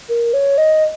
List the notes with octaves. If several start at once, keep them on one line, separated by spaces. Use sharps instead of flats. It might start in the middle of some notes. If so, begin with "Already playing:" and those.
A#4
C#5
D#5